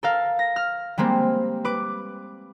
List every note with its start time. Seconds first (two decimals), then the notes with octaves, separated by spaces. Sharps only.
0.03 A4 A#4 F5
0.39 A#6
0.56 F6
0.98 G3 G#3 A#3 C4
1.65 B4 D6